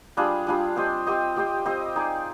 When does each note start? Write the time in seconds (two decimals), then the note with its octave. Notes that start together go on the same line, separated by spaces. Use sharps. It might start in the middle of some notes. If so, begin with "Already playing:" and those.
0.17 G3 D4 F4 G#4
0.47 G3 D4 F4 G#4
0.76 C4 G4 C5 D#5
1.07 C4 G4 C5 D#5
1.36 C4 G4 C5 D#5
1.66 C4 G4 C5 D#5
1.96 D#4 G#4 D5